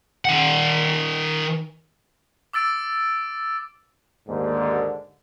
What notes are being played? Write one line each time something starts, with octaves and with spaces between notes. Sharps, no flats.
D#3 F#5
D6 E6 A6 D7
D#2 G#2 D3